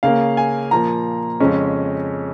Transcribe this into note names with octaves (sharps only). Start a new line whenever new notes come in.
C#3 A#3 C#4 F5
G#5
A#2 F3 A#3 A#5
F2 C#3 G#3 C#4